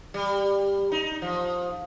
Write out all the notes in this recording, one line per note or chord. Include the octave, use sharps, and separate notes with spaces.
G3
D#4
F3